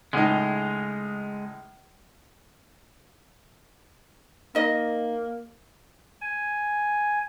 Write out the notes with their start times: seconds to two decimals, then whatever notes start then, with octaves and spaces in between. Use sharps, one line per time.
0.13 C#2 A2 G#3 D#4
4.55 A#3 D#4 D#5
6.21 G#5